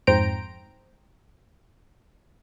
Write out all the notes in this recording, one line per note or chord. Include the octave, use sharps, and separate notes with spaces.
F2 G#2 C5 G5 A#5 D7